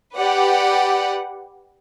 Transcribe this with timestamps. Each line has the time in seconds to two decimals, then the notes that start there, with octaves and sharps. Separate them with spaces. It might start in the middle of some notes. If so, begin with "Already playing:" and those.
0.17 G4 B4 D5 F#5